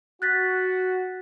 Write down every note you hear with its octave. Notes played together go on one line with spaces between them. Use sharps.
F#4 F#6 A6 B6